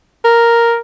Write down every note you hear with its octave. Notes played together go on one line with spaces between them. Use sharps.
A#4